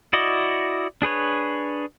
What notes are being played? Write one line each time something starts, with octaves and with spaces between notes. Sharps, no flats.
E4 F#4 D5 D#5
D4 G#4 B4 C#5